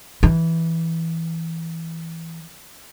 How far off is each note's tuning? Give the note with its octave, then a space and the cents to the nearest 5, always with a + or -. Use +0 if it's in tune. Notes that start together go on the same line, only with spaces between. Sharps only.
E3 -5